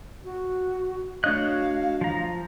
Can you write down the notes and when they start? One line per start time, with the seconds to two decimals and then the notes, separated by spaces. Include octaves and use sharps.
0.25 F#4
1.24 A3 D4 F#4 C#5 D#5 F5 F#6
2.01 F3 A#5